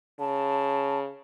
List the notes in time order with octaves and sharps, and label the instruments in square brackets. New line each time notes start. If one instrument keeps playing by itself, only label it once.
[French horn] C#3 [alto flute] A5